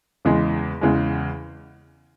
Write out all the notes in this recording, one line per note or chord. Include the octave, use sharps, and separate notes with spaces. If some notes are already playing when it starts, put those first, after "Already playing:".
E2 C#3 E3 G#3
E2 C#3 E3 G#3